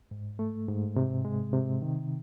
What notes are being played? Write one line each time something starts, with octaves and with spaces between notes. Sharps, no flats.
G#2
A3
G#2
C3
G#3
C3
D#3